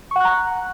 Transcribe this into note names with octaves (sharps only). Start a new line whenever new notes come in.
F#5 A#5 C#6 F#6